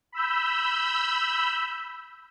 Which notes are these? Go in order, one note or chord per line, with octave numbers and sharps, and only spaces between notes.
B5 E6 G6